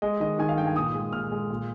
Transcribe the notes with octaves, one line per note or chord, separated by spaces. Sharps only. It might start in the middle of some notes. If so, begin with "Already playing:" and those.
G#3 D#5
D#3 D#5
D#3 G#5
F5
G2 G5
G#5
A#2 D#6
G#3
A#2 F6
G#3
A#2